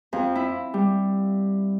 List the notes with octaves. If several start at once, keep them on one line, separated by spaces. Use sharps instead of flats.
F2
E4
G3